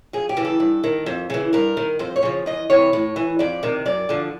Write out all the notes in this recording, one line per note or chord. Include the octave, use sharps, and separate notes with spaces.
F2 G#4
G4
C#3 E3
A4
G2
D#3
F2
C#3 E3
G2 A#4
D#3
F2 C5
C#5
C#3 F3
E2 D#5
C3 E3 C#5
A2
E3
F2 D5
C3 D#3
F#2 D5
D3 F3